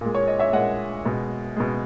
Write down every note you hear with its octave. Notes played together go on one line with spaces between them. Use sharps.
A#2 G#3
C#5
D#5
C#5 E5
A#2 G#3 D#5 F#5
B2 G#3
B2 G#3